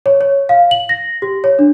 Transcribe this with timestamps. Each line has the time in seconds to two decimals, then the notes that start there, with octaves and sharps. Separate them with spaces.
0.06 C#5
0.21 C#5
0.49 F5
0.71 F#7
0.89 A#6
1.22 G4
1.44 C#5
1.59 D4